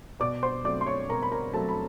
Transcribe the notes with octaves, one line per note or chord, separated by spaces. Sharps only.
B2 D5 D6
C5 C6
F#3 A3 C4 D5 D6
C6
C#5 C#6
B2 A#4 A#5
B5
A#4 A#5
F#3 A3 C4 A4 A5
B5